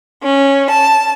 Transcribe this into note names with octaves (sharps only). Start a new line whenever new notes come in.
C#4
A5